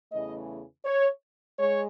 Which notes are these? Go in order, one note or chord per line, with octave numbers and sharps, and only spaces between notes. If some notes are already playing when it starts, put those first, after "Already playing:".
E2 C#3 E3 A3 D#5
C#5
G#3 C#5